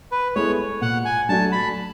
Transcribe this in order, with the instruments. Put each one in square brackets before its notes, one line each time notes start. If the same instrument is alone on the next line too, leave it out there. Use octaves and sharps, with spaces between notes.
[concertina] B4
[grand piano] G#3 B3 E4 A4 [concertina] C#5
[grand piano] A#2 [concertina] F#5
[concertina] G#5
[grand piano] F#3 A3 D4 F#4 [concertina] A5
[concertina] B5